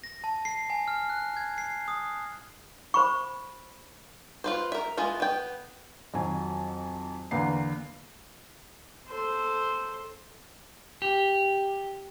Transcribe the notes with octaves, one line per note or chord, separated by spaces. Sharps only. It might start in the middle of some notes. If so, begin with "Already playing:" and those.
A#6
A5
C7
G#5
F6
F#6
G#6
C7
D#6
C5 B5 C#6
F4 B4 C5
A#4 E5
G#3 B3 E4 F4
B3 G5
F2 D#3 F#3 G#5
E2 D3 A#3 F#5 C7
A4 C5
G4